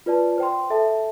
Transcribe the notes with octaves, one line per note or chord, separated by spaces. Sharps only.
F4 B4 D5 A5
C5 G5 C6
A4 E5 A5